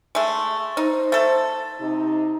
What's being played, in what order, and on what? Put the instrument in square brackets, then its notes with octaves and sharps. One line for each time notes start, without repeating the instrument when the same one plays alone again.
[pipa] G#3 A3
[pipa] D#4 [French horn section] C5
[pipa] A3 A4
[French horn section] C3 D#4